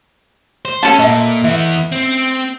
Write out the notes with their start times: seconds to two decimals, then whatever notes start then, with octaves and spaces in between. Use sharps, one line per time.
0.65 C5
0.83 C#4 A4 F#5 A5 B5
0.99 A#2 D#5 E5
1.44 E3 B3 E5
1.92 C4